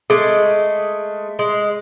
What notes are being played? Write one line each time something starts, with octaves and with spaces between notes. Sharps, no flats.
G#3 A3 G#4 A4
G#3